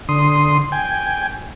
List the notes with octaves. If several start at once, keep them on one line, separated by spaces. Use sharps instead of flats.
D3 C6 D#6
G5 G#5